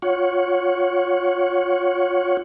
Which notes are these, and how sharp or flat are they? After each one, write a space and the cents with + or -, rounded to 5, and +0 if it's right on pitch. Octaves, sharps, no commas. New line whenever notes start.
F4 +25 C#5 +0 F#5 +10